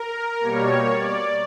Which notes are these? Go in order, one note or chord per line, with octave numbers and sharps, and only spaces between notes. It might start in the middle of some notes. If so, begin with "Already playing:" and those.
Already playing: A#4
B2 G3 A#3 C#5
D5